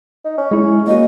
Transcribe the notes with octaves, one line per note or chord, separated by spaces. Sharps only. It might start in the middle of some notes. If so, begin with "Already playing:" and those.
D#4
C#4
G#3 E4
A#3 F#4 D#5